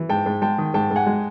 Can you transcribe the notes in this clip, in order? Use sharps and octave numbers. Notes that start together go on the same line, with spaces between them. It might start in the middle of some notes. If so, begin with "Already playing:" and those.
Already playing: E3
G#2 G5 A5
G#2
G#3 G5 A5
D#3
G#2 G5 A5
G#2
F#5 G#5
G#3